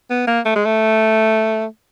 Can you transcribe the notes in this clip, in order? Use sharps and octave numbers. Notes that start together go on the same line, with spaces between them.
B3
A#3
A3
G#3
A3